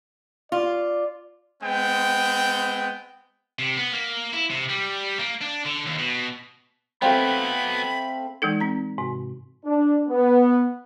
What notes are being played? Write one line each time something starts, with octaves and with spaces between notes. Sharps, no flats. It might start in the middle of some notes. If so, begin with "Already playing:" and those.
F4 D5
G#3 B3 C4 G5
C3
B3
A#3
E4
C3
G3
A#3
D4
D3
D#2
B2
F#3 A3 B3 C4 C5 F5 G5 B5
E3 G#3 D#4 A4
C4 A#5
G#2 C3
D4
B3